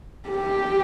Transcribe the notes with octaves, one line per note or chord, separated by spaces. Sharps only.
G4